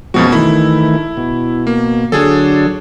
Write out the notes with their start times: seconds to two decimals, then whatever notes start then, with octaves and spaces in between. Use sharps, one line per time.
0.14 F#2 B2 F3 G#3 C4 F#4
0.32 D#3 E3 A3 E4
1.17 B2
1.67 A#3
2.12 D3 F#3 D4 G#4 A4